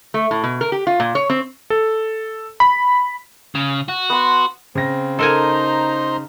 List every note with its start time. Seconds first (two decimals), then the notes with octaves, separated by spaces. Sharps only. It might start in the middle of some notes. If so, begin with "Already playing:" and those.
0.14 A3
0.31 A2
0.44 B2
0.61 A#4
0.72 G4
0.87 F4
1.00 A#2
1.15 C#5
1.30 C4
1.70 A4
2.60 B5
3.55 C#3
3.88 F#4
4.10 B3 C6
4.75 C#3 C4 A#6
5.19 D#4 A4 A#4 C5 G#5 A#5 C6